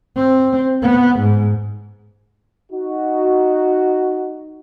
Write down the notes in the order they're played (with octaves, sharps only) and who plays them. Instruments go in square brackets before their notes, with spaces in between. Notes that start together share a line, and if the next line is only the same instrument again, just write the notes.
[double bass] C4
B3
G#2
[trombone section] D#4 F#4